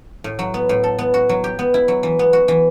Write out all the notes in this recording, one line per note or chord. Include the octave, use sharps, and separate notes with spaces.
A2
F#3
B3
A2
A4
B3
F#4
F#3
G4
B3
E4
F#3
E3
B3
F#4
E3